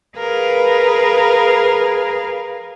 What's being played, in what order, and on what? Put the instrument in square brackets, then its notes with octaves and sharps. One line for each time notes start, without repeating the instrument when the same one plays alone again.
[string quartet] G#4 A#4 B4 F5